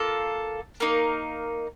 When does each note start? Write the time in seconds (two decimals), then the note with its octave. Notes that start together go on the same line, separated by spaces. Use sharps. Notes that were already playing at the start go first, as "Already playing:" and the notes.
Already playing: A#3 F4 A4
0.80 A#3 D#4 A#4